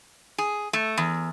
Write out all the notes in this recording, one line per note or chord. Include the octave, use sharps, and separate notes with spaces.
G#4
A3
E2